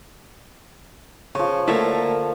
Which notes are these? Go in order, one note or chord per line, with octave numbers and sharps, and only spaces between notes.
C#3 F3 C#6
D3 A3 A#3 E4 A4 A#4 C#5